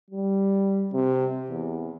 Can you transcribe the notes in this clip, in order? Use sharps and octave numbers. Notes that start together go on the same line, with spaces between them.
G3
C3
E2